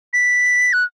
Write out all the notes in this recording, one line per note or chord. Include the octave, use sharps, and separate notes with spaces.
B6
F#6